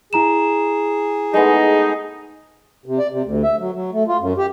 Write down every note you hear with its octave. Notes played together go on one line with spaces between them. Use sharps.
E4 G#4 A#5 E7
G#3 A3 B3 D#4
C3
D5
C3
D2
E5
F#3
F#3
A3
F4
F#2
G4